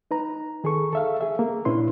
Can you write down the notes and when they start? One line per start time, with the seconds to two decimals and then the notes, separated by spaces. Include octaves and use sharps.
0.11 D#4 B4 A#5
0.64 D#3 G#4 A4 C#6
0.93 A4 E5 F5
1.21 G#4 E5
1.39 A#3
1.65 A#2 C#4 D4 E4 B4 C6